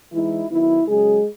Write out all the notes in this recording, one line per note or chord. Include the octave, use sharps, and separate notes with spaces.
E3 G#3 D#4 E4
D#3 F#3 B3 E4
C#3 F#3 G#3 C#4 G#4